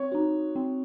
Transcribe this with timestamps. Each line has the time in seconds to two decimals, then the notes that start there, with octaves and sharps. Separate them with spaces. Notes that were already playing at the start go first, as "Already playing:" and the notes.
Already playing: C4 C#5
0.12 D#4 F#4
0.56 C4